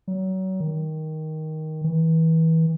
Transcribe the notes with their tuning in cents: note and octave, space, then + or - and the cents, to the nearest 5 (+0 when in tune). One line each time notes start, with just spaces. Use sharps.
F#3 +30
D#3 +10
E3 -30